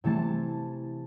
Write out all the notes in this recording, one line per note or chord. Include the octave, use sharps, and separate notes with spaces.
C3 E3 A3 A5